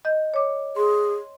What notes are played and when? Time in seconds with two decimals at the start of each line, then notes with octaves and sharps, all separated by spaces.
0.05 D#5 G6
0.34 C#5 D6
0.76 G#4 C6